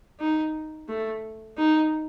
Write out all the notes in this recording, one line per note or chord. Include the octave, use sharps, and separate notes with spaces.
D#4
A3
D#4